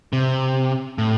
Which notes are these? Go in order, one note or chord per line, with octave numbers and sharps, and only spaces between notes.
C3
A2